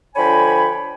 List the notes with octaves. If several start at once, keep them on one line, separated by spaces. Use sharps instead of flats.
D3 F3 C#5 G5 G#5 B5